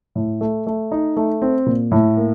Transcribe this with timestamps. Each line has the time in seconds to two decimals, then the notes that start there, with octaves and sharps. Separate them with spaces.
0.15 A2
0.41 A3
0.67 A3
0.92 D#4
1.17 A3
1.42 C4
1.66 A#2
1.92 A2
2.17 A#3